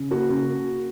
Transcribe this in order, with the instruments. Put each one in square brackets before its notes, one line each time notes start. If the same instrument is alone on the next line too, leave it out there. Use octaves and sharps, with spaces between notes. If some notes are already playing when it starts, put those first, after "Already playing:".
Already playing: [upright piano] C#3
A#3 F#4
C#3